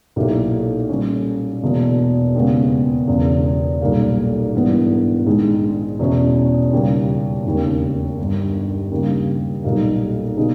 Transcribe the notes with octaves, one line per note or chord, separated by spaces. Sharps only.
B1 A#2 A#3 E4 G4
A#2 G3 C#4
E1 E2 B2 A#3
D#2 C#3 G#3 B3
E1 E2 C#3
B1 A#2 G3 A#3
G#1 G2 E3 G3 B3
A#1 G#2 D#3 G#3
E2 B2 G#3 C#4 E4
D#2 C#3 G3 A#3
E1 D#2 C#3
G1 G2 G3
D#2 C#3 G3 A#3
B1 A#2 G3 A#3 D#4
B2 A#3 D#4 G#4